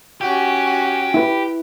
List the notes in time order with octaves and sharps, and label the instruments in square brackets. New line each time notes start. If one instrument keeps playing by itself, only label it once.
[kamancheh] C#4 F#4 [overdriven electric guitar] G4
[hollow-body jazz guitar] E4 B4